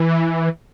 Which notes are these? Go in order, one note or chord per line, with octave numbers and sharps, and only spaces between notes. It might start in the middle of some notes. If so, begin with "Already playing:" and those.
Already playing: E3